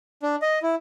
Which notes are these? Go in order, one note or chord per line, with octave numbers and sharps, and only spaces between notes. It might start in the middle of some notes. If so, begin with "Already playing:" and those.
D4
D#5
E4